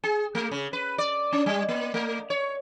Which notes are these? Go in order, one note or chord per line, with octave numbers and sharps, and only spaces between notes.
G#4
A3
C#3
B4
D5
C#4
G3
A#3
A3
C#5